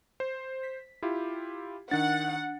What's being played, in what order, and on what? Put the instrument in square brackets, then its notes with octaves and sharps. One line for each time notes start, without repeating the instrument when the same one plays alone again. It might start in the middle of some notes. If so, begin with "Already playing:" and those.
[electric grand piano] C5
[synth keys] B6
[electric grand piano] E4 F4 G4
[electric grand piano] D#3 A6 [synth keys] D4 [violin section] F#5